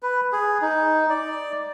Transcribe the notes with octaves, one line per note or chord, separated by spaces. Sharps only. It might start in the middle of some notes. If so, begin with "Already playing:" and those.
B4
G#4
D#4
D5